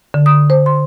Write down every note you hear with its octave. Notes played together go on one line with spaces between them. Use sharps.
D3
D#6
C5
C6